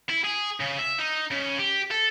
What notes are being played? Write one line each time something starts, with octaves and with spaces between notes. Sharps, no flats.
E4
G#4
C#3
E5
D#4
C#3
G4
A4